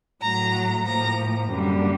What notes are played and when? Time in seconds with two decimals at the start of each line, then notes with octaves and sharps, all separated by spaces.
0.22 A2 F#3 A3 A#5
0.85 A2 F3 A#3 A#5
1.50 F#2 D3 G3 A#3